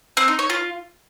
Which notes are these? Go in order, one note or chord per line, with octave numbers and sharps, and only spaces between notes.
C4
D#4
C#5
F4